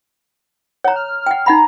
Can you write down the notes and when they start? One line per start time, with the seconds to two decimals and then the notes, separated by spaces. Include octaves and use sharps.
0.84 C#5 F#5 A#5
0.96 F6
1.26 F#5 G5
1.46 D#4 F#5 A#5 B5